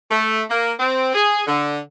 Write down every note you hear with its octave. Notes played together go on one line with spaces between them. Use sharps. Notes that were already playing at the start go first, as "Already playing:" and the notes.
A3
A#3
C4
G#4
D3